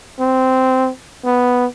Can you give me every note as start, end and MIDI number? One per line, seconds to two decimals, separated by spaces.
0.19 0.89 60
1.25 1.66 59